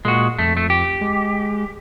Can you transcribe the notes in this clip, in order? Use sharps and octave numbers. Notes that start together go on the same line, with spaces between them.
A#2 G#3 F#4
F2 A3
A3
G4
G#3